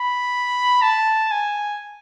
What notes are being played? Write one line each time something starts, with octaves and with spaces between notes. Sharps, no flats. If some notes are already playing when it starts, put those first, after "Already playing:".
Already playing: B5
A5
G#5